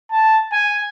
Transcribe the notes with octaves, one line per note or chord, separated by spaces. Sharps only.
A5
G#5